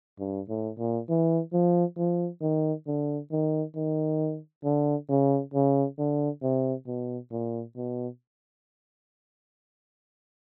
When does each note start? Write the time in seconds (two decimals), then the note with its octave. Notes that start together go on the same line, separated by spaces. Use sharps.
0.19 G2
0.49 A2
0.79 A#2
1.09 E3
1.53 F3
1.97 F3
2.42 D#3
2.87 D3
3.32 D#3
3.76 D#3
4.64 D3
5.09 C#3
5.54 C#3
5.98 D3
6.43 C3
6.87 B2
7.32 A#2
7.76 B2